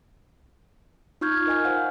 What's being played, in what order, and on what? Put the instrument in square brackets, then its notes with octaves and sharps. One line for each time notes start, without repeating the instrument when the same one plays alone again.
[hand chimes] D#4 F4 C#6 F6 G6 G#6
A#4 D#5 G#5 F6
C5 F5 F#5